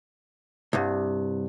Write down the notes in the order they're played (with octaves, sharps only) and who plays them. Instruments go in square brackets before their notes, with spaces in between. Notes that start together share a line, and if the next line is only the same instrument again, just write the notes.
[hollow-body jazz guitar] C2 G2